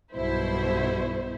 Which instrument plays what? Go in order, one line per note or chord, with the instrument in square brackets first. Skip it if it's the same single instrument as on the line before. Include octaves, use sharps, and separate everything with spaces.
[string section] B1 G2 B2 E4 C5